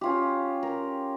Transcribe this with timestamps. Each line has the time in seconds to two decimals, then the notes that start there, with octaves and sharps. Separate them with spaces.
0.01 C#4 F4 G4
0.63 A#4